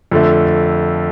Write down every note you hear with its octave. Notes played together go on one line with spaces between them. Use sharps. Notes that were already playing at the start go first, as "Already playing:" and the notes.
F2 D3 A3